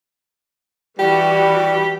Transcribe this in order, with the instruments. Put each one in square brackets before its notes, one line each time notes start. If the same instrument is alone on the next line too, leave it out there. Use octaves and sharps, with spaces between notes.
[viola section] E3 F#4 [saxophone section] G3 [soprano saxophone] G4